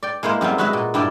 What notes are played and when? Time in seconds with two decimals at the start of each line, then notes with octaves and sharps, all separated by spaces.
0.03 D5 G5
0.23 G#3 A#3 E4 C5
0.41 F#2 G3 B3 C4
0.58 G#3 F#4 B4 D#5 E5
0.73 A#2
0.94 G2 E4 G4 D5